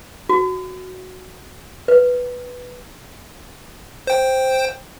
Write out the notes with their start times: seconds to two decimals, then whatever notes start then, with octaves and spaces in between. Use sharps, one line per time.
0.29 F#4
1.88 B4
4.07 C5 G5